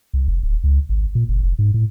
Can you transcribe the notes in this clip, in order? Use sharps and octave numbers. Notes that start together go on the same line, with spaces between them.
C2
F1
D1
C#2
G#1
A#2
F#1
F1
G#2
A2